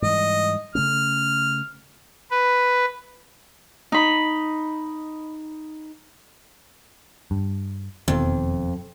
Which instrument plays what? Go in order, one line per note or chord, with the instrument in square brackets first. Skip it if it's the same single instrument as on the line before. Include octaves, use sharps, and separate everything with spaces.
[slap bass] G#2 E3 G3 [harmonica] D#5
[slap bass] C#3 A3 C#4 [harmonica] F6
[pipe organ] B4
[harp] D#4 B5
[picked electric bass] G2
[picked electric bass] E1 D#3 B3 [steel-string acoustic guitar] F2